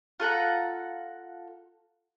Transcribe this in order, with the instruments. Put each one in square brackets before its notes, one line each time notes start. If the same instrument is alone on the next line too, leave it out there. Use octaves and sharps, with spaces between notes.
[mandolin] F4 A4 F#5 A#5